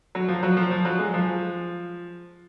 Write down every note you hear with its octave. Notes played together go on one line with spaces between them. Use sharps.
F#3
F3
F#3
F3
F3
F#3
G#3
F3